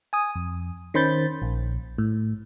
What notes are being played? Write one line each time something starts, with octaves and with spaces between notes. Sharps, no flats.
G#5 D#6
F2
D#3 C#4 C5 B5 G6 A6
A#1
A2